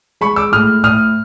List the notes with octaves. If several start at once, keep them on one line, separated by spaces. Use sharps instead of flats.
G#3 B5 C#6
D6 E6
A2 D#6 F6
A2 D#6 F6